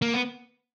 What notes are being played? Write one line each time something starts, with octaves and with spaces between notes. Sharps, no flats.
A#3
B3